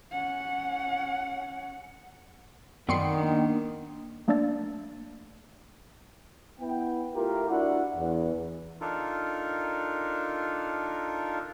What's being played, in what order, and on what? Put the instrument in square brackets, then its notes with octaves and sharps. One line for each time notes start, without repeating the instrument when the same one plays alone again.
[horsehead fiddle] C#4 F#5
[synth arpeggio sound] F#2 C6 C#7 [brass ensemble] D#3 [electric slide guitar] B3 D5 G5
[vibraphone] A#3 D4
[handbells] A3 A#3 D4 D5 E6 A6
[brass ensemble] B3 E4 G5
A3 E4 F4 G4 A#4
D4 E4 F#4 F#5
E2
[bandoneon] D4 D#4 F4 A4 A#4